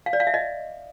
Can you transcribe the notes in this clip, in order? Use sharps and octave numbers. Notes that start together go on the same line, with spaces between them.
F5
D5
F5
E5
D#5